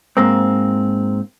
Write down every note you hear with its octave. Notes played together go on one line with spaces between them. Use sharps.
G#2 A#3 C4